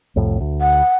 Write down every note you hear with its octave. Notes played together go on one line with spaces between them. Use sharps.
C2 F2 A2
D2
F#5